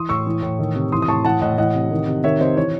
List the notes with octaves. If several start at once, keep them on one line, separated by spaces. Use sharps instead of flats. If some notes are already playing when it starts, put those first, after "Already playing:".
Already playing: E3 C6 D#6
A2 C#6 E6
E3
A2
D#3
C3
E3 C6 D#6
D#6
A2 A5 C#6
E3 F#5 A5
A2 D#5 F#5
E3 D#5 F#5
C3
D#3
C3
D#3 C#5 E5
C3 C5 D#5
E3 C#5